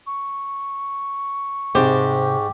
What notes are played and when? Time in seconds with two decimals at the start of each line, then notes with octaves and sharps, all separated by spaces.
0.07 C#6
1.75 G#2 C3 G4 C5